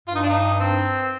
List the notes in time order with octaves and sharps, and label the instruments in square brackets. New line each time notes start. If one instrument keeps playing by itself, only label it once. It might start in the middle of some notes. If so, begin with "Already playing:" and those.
[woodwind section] G2 [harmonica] F4
[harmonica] D#4
D4
D#4
C4